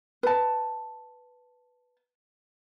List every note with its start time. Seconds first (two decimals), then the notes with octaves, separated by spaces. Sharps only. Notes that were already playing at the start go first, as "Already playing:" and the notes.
0.23 B4 A5